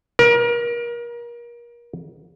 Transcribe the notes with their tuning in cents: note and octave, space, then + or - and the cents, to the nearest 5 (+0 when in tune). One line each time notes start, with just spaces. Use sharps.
A#4 +30